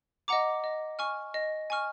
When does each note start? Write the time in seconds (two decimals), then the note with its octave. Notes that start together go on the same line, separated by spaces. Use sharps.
0.28 D#5 F#5 A#5 D6
0.64 D#5
0.99 G#5 C#6 F6
1.34 D#5
1.70 G#5 C#6 F6